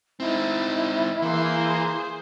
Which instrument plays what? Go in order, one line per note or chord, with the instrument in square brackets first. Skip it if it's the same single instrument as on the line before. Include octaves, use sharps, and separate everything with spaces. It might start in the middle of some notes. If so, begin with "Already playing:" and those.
[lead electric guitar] C4 D#4 [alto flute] E4
[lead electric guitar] E3 [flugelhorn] A#3 [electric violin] G#4 C5